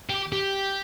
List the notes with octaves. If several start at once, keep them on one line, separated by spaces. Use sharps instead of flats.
G4
G4